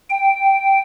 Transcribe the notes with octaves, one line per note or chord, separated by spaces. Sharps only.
G5